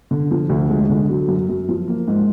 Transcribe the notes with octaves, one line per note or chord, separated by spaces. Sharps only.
D3
F3
D2
G#3
D3
F#3
F#2
F#2
F3
A#3
G#2